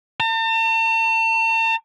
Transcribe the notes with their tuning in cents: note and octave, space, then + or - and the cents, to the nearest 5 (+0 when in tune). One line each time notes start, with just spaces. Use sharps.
A5 +45